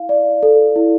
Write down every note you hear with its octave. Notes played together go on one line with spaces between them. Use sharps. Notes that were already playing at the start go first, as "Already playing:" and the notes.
Already playing: E4 F5
D5
A4
E4